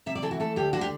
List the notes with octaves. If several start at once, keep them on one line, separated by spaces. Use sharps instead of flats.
C3 E5
D5
E3 A4
F#4
A3 A4
D2 G4
D3 F#4
G4